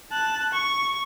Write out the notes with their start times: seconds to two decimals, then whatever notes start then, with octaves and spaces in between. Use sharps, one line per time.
0.12 A5 F#6
0.53 C#6